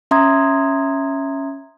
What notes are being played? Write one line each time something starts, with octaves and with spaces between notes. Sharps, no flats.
C#4 E5 A#5 C6 D#6 G#6